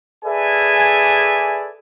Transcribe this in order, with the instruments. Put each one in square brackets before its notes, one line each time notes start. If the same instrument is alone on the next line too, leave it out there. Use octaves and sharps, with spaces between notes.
[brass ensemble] G#4 A4 B4 D5 E5 G#5